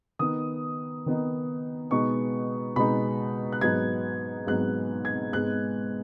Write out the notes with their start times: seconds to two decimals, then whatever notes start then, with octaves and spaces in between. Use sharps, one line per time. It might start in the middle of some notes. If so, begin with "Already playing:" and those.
0.19 D#3 B3 D#4 D#6
1.06 D#3 B3 D#4
1.91 B2 G#3 B3 D#4 C#6
2.76 B2 G#3 B3 D#4 B5
3.52 F#6
3.61 G#2 F#3 B3 D#4 G#6
4.47 G#2 F#3 B3 D#4 F#6
5.05 G#6
5.32 G#2 G#3 B3 D#4 F#6